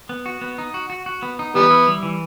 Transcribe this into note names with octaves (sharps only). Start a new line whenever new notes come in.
B3
F#4
B3
D#4
F#4
F#4
F#4
B3
D#4
E3 G3 B3
E4
G3
E3